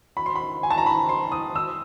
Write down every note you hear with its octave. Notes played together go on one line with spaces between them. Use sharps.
B5
C6
B5
G#5
A5
A#5
B5
C6
D#6
E6